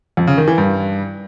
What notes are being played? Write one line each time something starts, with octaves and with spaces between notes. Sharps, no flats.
F2
C#3
D#3
E3
G2